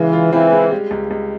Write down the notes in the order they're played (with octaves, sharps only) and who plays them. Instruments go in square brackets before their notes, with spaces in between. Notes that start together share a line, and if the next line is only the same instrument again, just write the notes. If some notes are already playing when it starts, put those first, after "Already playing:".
Already playing: [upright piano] C#3 G#3 [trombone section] E3
[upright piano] F4
[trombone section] E3 [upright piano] C4
[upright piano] G#3
G3
C#2
C#2